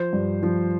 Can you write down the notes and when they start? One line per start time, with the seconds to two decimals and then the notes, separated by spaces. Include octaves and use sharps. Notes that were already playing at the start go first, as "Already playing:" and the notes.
Already playing: F3 C5
0.13 G2
0.43 F3